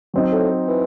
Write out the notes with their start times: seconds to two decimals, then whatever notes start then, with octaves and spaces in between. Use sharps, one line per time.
0.14 F#3 C4 D#4
0.32 A2
0.68 E3